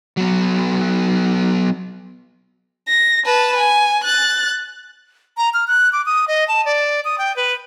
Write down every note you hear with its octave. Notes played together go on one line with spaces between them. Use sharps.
F#3 B3
A#6
B4 A5
G#5
F#6 A6
A#5
F6
F#6
D6
D#6
D#5
A5
D5
D#6
G5
B4